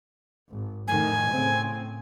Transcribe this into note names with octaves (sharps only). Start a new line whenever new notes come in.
G#1
F2 A2 D#3 G#5
A2 C#3 C4